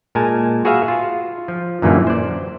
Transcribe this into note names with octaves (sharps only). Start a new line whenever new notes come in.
A#2 G#3 A#4 G#5 A5
F#4 G#4 B4 E5 F5
F4
F3
F#2 A#2 D3 E3 G3 A#3
C5 D5